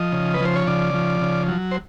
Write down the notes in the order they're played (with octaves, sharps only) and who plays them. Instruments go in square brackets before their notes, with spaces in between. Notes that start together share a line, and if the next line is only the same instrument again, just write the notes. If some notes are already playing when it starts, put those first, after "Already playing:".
Already playing: [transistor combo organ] F3 D#5
C#3
B4
F3 C5
C#5
C#3 D5
F3
C#3
F#3
C5